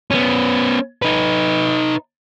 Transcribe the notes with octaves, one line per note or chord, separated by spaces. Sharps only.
B3 C#4
D#4 B4